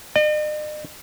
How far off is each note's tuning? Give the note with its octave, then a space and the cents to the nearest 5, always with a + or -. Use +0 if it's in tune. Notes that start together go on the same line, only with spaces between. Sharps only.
D#5 -45